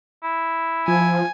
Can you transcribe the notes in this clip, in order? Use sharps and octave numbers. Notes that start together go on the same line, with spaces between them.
E4
F3 G#5